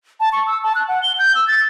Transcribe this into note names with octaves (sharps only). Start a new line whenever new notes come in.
A5
C#6
E6
A5
F#6
F#5
G7
G6
E6
A6